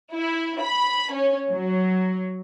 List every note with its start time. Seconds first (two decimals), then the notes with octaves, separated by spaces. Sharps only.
0.14 E4
0.60 B5
1.13 C#4
1.49 F#3